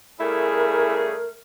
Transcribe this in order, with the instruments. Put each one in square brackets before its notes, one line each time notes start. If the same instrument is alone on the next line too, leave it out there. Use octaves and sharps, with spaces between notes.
[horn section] C#3 G3 G#4 [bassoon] A3 [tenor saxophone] E4 [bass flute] A#4